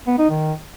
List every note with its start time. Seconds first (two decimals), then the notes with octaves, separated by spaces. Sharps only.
0.07 B3
0.18 D#4
0.30 D#3